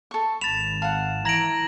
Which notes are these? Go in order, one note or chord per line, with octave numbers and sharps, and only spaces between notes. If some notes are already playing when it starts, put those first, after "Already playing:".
A4 C#6
G#1 B5 A6 E7 F7
F5 F#5 A5
E3 A#5 G#6 A#6 D7 F#7